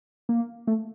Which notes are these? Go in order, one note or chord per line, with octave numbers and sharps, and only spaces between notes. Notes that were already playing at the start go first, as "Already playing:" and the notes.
A#3
A3